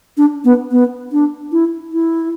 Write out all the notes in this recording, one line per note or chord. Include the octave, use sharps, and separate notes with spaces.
D4
B3
B3
D4
E4
E4